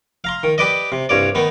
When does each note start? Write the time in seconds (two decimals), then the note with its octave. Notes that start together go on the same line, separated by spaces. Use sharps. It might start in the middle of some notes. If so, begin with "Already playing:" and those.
0.24 F5 A#5 C6
0.43 D#3
0.58 G4 B4 D5 D#5
0.92 C3
1.09 C2 G2 C#5 D5
1.35 D#3 B3 D#4